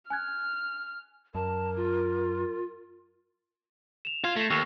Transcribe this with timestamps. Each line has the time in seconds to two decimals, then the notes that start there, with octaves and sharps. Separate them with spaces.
0.10 G#5 F6 F#6 G#6
1.35 F#2 A#4 A5
1.76 F4
4.05 E7 F7
4.24 F4 G#6
4.36 A3 A#6 C7
4.50 D#2 C#6 E6 A#6